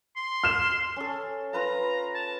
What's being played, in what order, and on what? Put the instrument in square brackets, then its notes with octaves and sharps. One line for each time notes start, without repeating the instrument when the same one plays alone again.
[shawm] C6
[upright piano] F6 E7
[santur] C#4 A4
[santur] F4 B4 F5 [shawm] A#5
[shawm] A5